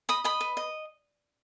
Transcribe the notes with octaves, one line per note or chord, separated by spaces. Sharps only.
D#5 B5 D#6
D#5 B5 D#6
B4
D#5